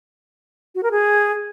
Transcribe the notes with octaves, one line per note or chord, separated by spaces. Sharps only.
F#4
A#4
G#4